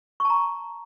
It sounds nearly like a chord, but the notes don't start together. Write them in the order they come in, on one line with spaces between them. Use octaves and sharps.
C#6 A5 A#5